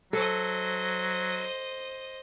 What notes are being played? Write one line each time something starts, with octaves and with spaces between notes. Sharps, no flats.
F#3 A4 C5 D#5